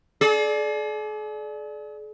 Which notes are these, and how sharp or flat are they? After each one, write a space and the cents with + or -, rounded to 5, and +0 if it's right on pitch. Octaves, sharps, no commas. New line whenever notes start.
G#4 +45 D5 +5